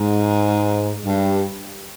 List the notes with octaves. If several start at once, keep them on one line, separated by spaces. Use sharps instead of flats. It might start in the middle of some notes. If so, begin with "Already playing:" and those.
Already playing: G#2
G2